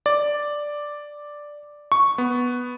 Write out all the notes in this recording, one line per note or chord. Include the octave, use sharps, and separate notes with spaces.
D5
C#6
B3